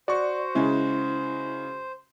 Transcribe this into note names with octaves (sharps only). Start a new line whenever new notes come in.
F#4 C5 D5 C#6
C#3 G#3 E4